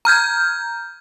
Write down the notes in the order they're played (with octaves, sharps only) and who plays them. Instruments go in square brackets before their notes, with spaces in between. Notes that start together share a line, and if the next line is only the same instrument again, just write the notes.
[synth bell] A#5 F6 G6 G#6